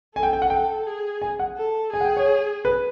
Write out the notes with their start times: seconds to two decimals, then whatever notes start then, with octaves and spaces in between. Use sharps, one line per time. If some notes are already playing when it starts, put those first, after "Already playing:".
0.15 A4 G#5
0.23 G5
0.33 G5
0.42 F#5
0.50 G5
0.86 G#4
1.22 G#5
1.39 F#5
1.57 A4
1.93 G#4 G#5
2.01 F#5
2.05 G5
2.17 C#5
2.65 B4